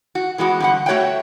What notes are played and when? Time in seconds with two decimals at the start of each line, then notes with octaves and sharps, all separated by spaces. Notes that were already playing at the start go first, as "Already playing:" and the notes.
0.15 F#4
0.38 E3 G#3 B3 F#4
0.60 G2 D3 F#5
0.86 A3 F#4 C#5 E5 F#5 G5